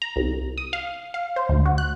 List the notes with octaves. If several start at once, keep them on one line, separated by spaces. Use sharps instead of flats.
A#5
C2
D#6
F5
F5
C5
D2
F#4
F#6